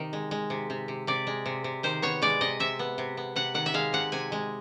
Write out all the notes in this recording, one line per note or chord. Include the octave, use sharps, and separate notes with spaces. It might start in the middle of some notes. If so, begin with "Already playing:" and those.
Already playing: C3 D#3
G#3
G#3
C3
C3
C3
C3 D5
G#3
C3
C3
D#3 C5
B3 C#5
G#3 D5
C3 D#5
C3 E5
B3
C3
B3
C3 F#5
D#3 F#5
E5
G#3 F5
C3 F#5
C3 G#5
G#3